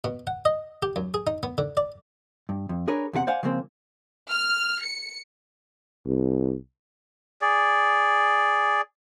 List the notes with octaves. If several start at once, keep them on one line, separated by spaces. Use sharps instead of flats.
B2
F#5
D#5
G4
F#2
G#4
D#4
B3
D3
D5
G2
F2
D4 G#4 A#4 B4 C#5
E2 C3 G4 F#5
C5 D5 F5 F#5 G#5
C#3 F3 G#3 A#3 C4
F6
C#7
C2
G#4 D5